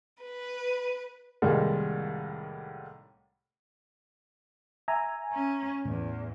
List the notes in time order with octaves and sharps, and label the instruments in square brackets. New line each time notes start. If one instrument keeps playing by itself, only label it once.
[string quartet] B4
[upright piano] C2 A2 D#3 G3 G#3 A#3
[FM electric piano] E5 G#5 A#5
[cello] C#4
[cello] E2 [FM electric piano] A2